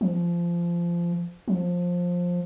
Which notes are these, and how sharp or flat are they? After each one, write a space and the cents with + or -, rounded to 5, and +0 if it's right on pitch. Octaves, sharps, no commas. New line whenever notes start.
F3 -20
F3 +15